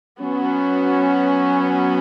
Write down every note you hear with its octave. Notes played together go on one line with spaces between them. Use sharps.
F#3 B3 C#4 F#4